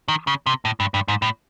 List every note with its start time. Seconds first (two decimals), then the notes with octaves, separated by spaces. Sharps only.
0.08 D#3
0.27 C#3
0.46 C3
0.65 A2
0.80 G2
0.94 G2
1.08 G#2
1.22 A2